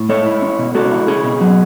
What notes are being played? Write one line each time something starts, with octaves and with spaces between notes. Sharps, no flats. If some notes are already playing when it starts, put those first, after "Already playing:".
Already playing: A2
G#3 A4 C#5
E4
C#4
B2
G#3 F#4 A4
E4
C#4 G#4
B2
F#3